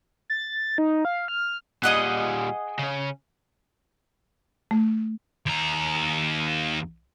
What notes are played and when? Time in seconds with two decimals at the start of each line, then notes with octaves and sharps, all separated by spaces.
0.30 A6
0.78 D#4
1.05 F5
1.28 F6
1.84 A#2 G3 G#4 D#5 F#5
2.79 C#3 C#4
4.71 A3
5.46 D#2 A#5